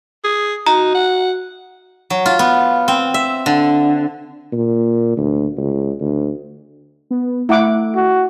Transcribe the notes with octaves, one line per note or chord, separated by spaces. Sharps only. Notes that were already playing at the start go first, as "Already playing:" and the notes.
G#4
D#4 F#4 A#5
F#5
F#3
F4
B3
C4
E5
D3
A#2
D2
C#2
D2
B3
A3 E4 F#5 D6
F#4